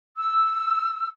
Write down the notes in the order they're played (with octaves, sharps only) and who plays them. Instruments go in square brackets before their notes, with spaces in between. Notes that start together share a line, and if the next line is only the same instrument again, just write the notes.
[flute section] E6